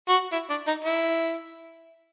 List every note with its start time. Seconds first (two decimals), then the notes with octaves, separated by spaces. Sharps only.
0.09 F#4
0.32 E4
0.50 D4
0.67 D#4
0.85 E4